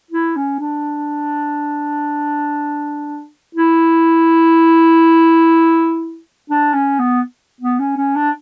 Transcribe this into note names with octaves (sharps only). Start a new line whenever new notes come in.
E4
C#4
D4
E4
D4
C#4
B3
B3
C#4
C#4
D4